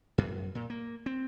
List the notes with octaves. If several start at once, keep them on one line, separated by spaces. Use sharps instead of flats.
F#2
A#2
A#3
C4